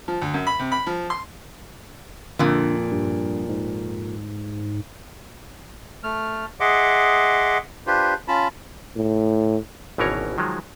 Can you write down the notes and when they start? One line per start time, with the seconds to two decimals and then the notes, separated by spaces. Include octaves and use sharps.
0.08 F3
0.22 D2
0.34 F#2
0.47 B5
0.59 C3
0.72 B5
0.87 F3
1.10 C6
2.39 F2 A#2 D3
2.91 G2
3.49 G#2
6.03 A3 F6
6.60 G#4 D#5 E5 F#5 C6 D6
7.87 D4 F4 G4 B4 C5
8.28 C#4 F4 A5 B5
8.96 A2
9.98 G#1 B2 E3 C#4 A#4 C#5
10.38 D#3 F3 F#3 G#3